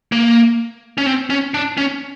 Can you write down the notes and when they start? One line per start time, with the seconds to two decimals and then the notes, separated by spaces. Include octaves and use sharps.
0.12 A#3
0.98 C#4
1.06 C4
1.30 C#4
1.54 D4
1.77 C#4